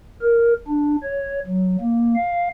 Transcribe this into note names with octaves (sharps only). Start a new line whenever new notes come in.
A#4
D4
C#5
F#3
A#3
F5